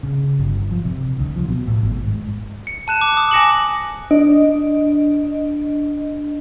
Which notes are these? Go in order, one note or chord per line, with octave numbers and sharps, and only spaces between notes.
C#3
G1
F3
C3
D2
F3
B2
A2
G#1
G#2
C#7
A5 F#6 E7
D6
D#6
G#5 D6 A#6 C#7 E7 F#7
D4 D#5